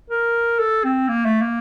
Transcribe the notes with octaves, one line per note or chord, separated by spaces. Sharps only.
A#4
A4
C4
A#3
A3
A#3